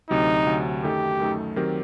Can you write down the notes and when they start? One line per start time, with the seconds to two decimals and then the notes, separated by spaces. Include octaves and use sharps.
0.10 D2 C3 F#3 D#4
0.46 D2 C3 F#3
0.83 F#2 D#3 A3 D#4 G4 A4
1.20 F#2 D#3 A3 D#4 A4
1.56 D#3 F#3 C4 G4 A#4